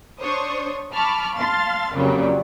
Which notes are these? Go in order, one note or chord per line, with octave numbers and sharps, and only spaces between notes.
D4 C5 C#5 C#6 D#6
A5 B5 C#6 D6 F6
F5 A5 C6 F6 A6
F2 A#2 C#3 F#3 G3